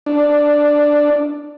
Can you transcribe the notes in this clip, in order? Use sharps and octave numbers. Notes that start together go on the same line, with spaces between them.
D4